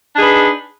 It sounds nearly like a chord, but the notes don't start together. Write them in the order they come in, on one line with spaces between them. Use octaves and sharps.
D4 D#4 G#4 B4